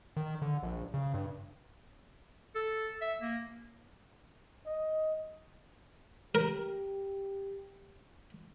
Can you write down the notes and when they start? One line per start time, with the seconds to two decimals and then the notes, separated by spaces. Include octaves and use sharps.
0.17 D#3
0.42 D3
0.63 A#1
0.94 C#3
1.14 G2
2.55 A4
3.02 E5
3.21 A#3
4.66 D#5
6.35 G4 A#4